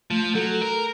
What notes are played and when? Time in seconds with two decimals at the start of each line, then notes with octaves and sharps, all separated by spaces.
0.11 F3 A3
0.35 F#3 A4
0.61 A#4